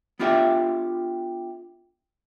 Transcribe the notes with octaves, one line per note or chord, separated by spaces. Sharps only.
B3 D4 F4 G4 A4 E5